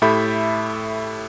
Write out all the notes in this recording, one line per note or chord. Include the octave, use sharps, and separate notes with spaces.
A2 G4 A4 E5 B5 G6